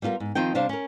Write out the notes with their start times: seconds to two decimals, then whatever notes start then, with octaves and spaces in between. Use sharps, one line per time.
0.02 G3 B3 F4 A4 A#4
0.20 G#2
0.35 D#3 F3 C4 D#4 F4 G5
0.55 C3 G3 D4 C5 F5
0.69 C#4 A#4